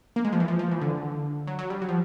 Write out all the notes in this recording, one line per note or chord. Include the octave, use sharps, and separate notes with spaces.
A#3
G#3
F3
E3
F3
F3
E3
D3
F#3
F#3
G3
F#3
F3